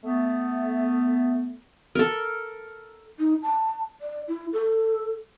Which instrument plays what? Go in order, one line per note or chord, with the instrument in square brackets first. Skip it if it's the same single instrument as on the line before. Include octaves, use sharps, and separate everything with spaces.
[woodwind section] A3 B3
[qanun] A4 A#4
[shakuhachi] D#4
A5
D5
E4
A4